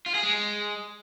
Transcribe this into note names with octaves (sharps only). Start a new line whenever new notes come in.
F4
G#4
G#3